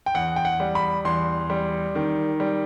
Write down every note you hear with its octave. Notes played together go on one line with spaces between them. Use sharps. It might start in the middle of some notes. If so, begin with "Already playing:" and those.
G5
E2 F#5
G5
F#5
G3
B5
E2 C6
G3
D#3
G3